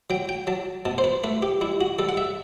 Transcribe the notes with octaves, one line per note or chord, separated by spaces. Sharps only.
F#3 G5
G5
F#3 A5
B2 A5
C5
B4
A3 B4
G4
G3 E4
F#4
G3 A4
F#5
E5